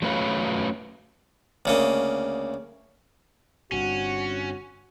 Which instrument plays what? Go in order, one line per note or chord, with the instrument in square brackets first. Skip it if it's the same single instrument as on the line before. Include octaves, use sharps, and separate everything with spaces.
[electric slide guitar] F#3 A3 C#4 B4 C#5 F5
[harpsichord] D2 C#3 A#3
[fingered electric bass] G1 G2 C3 [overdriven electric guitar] C#4 [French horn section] F#4